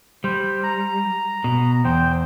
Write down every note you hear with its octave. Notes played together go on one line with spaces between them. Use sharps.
G3 C5
A#5
B2
E2 C5 G5